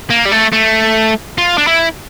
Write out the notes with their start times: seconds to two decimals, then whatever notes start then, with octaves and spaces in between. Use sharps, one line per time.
0.10 A#3
0.26 G3
0.32 A3
0.53 A3
1.38 F4
1.58 D4
1.67 E4